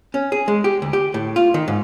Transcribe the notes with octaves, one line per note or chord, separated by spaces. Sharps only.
C#4
G#4
G#3
G4
D2
G4
A2
F4
D#3
G#2